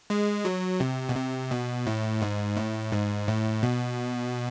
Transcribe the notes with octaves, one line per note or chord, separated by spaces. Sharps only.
G#3
F#3
C3
B2
C3
B2
A2
G#2
A2
G#2
A2
B2